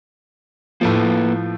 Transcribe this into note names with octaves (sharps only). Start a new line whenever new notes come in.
A2 F3 A#3 A4 B4